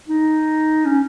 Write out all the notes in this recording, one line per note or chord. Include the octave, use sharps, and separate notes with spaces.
D#4
C#4